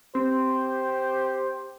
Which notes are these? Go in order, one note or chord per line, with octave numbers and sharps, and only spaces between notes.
C4 G4 C5